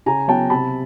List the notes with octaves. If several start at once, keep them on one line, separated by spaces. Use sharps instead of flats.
C#3 G#5 A#5
F#3 B3 G5 A5
C3 A5 B5